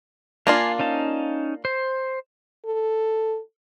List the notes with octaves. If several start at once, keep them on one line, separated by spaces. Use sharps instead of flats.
A#3 D4 F4 F5 G#5
C#4 D#4 A5
C5
A4